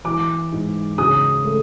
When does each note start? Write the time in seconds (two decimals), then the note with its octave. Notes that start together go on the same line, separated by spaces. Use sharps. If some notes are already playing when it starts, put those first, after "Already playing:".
0.04 E3 D6
0.52 G#2
0.98 C#3 D#6
1.45 A3